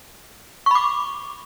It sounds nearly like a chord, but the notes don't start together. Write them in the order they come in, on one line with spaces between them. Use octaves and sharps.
C#6 B5 D6